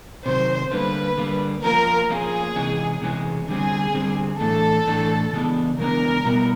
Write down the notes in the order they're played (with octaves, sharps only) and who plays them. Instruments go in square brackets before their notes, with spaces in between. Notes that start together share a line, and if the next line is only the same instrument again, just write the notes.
[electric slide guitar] C3 D#3 F#3 [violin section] C5
[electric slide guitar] D3 G3 A#3 [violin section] B4
[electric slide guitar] D3 G3 A#3
[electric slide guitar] F3 A#3 C#4 F4 [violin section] A#4
[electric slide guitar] F3 A#3 C#4 F4 [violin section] G#4
[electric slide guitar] C3 E3 G#3 C#4
C3 E3 G#3 C#4
[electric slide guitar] D3 G3 C4 [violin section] G#4
[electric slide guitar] D3 G3 C4
[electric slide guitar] A2 E3 A3 D4 [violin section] A4
[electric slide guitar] A2 E3 A3 D4
C#3 E3 G#3 B3 D4
[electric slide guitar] C#3 E3 G#3 B3 D4 [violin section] A#4
[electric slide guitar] B2 G3 B3 E4